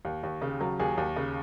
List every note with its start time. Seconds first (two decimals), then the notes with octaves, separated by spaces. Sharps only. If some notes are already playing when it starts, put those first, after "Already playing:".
0.05 D#2
0.23 D#2
0.42 C#3
0.61 F#3
0.80 D#2 G#4
0.98 D#2
1.17 C#3